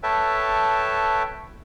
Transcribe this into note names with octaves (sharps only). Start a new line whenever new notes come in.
A4 B4 C#5 E5 G5 A5